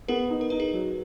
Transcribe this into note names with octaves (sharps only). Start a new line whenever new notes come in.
B3 G#4 A#4
D#4
A#4
D#4 B4
G#4 A#4
F#3